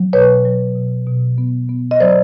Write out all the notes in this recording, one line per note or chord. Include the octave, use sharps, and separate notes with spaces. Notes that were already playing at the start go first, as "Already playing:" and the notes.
Already playing: F#3
B2 B4 C#5
F#3
B2
B2
B3
B3
D#5
F#3 C5 D5